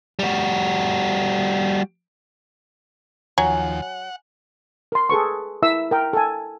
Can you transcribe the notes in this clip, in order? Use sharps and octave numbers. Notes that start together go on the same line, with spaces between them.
G3 F#4
D#2 F3 F#3 F#5 G#5
F#5
A#4 C6
G#4 A4 B4 C#6
E4 A#4 E5 E6
A#4 G5
A4 G#5